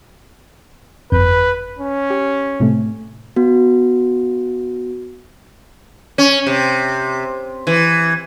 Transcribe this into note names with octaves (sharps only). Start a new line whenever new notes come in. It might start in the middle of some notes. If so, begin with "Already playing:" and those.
G1 F2 B4 G6
C#4
G4
A2 C3 A3
B3 F#4
C#4
C3
E3